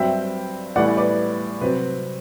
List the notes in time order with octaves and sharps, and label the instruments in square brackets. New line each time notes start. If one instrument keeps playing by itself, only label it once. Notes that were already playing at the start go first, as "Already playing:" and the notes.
Already playing: [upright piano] G2 F#3 C4 E5 G5
A2 E3 G3 B3 D5 F#5
B4 D5
C3 F#3 C4 B4